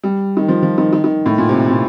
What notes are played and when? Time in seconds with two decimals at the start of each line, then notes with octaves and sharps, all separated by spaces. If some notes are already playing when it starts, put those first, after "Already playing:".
0.04 G3
0.37 D#3
0.48 F3
0.63 F3
0.78 D#3
0.93 D#3
1.04 D#3
1.26 A2
1.38 A#2
1.49 C3
1.71 A#2